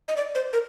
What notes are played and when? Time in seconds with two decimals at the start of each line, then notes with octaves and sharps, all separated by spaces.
0.08 D#5
0.17 D5
0.35 C5
0.53 A#4